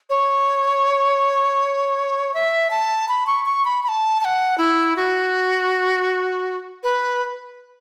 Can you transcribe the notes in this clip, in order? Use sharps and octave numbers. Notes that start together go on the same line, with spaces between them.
C#5
E5
A5
B5
C#6
C#6
B5
B5
A5
A5
F#5
E4
F#4
B4